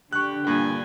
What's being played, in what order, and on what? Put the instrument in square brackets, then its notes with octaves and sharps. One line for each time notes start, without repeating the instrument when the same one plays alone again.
[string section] D3 [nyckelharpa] G4 [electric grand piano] C#6 F#6
[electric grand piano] G2 A#2 [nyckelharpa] G5 G#5